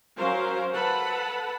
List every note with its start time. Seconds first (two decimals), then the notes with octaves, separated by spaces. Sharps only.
0.18 F#3 C#4 A#4 C5 F5
0.74 A4 B4 F#5 A5 B5